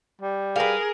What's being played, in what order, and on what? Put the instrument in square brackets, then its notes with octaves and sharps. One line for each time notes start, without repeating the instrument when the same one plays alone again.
[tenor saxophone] G3
[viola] G#4 A#4 [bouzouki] B4 F5